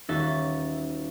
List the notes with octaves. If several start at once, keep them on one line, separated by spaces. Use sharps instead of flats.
D#1 C#4 D#4 F#4 E5 A6